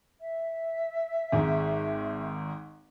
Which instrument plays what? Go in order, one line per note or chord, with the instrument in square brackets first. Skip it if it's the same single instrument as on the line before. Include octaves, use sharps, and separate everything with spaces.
[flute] E5
[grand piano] G#1 G#2